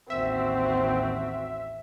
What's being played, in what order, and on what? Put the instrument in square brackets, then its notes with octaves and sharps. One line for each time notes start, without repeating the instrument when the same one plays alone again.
[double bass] A1 D#2 [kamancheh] C4 F#4 [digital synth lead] E5